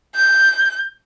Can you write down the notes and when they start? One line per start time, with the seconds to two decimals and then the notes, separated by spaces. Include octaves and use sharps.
0.15 G6